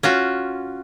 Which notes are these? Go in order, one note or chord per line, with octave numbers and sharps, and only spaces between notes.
C#4 F4 F#4